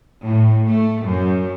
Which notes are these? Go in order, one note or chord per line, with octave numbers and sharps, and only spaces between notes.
A2
A3
F#2